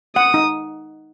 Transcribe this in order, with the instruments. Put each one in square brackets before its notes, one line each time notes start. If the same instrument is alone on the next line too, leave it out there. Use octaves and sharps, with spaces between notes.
[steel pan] F#5 [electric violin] D#6
[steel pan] D#4